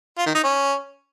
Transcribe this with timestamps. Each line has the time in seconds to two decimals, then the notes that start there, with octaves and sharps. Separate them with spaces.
0.18 F4
0.26 D#3
0.35 D#4
0.44 C#4